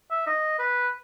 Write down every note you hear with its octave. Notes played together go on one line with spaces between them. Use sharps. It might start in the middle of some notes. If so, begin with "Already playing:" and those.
E5
D#5
B4